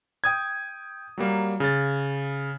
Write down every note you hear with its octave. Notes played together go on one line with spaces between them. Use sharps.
G5 D#6 G#6
F#3 G3 A#3
C#3 A6